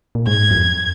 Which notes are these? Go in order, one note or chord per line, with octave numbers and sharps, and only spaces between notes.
A#2
G#2 G#6
F#2
F2